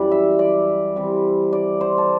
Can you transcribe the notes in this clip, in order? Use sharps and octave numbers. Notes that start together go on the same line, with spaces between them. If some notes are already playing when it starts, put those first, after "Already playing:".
Already playing: F#2 E3 G3 D5
E5
D5
E3 G3 C4
D5
C5
A4